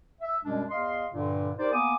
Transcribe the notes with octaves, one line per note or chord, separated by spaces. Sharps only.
E5
F#2 B2 G3 G#3 C#4 D4
E2 D#5 F5 C6
G2 A#2 D3
D#4 G4 A#4 C5 D5
A#3 B3 G#5 D6 D#6